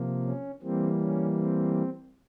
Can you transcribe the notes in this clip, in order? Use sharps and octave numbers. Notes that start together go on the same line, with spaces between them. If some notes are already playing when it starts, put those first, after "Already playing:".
Already playing: C3 F3 A#3
C#4
E3 G3 A#3 C4
C#4
C4